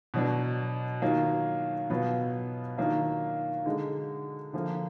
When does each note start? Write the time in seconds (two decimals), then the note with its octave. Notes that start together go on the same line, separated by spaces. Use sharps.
0.14 B2 F#3 D4
1.02 D#3 F#3 A#3 F4
1.90 B2 F#3 B3 F4
2.77 D#3 F#3 A#3 D4 F4
3.65 D3 G#3 D#4
4.53 D3 F3 A#3